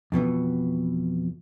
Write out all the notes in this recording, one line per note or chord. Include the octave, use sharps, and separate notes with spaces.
F2 B2 E3 B3